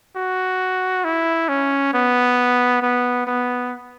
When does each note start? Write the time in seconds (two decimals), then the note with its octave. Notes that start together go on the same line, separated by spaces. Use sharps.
0.16 F#4
1.04 E4
1.49 C#4
1.93 B3
2.82 B3
3.27 B3